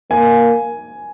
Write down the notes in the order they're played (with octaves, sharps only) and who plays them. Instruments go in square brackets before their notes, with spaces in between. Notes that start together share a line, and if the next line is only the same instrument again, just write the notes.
[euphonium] A#3 [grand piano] G#5